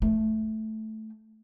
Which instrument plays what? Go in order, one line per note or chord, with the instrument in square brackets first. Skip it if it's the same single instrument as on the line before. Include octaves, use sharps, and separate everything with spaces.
[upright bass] A3